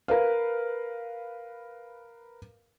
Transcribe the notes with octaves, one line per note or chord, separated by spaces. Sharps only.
A#4 B4 F5